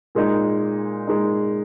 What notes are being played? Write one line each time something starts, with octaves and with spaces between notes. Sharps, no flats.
A#2 G#3 D#4
A#2 G#3 D#4